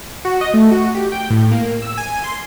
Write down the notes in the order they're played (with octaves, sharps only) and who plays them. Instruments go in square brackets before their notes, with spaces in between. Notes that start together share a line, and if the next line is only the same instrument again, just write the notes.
[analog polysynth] F#4
D#5
A3
F#4
G4
G5
A2
A#3
E6
G#5
C6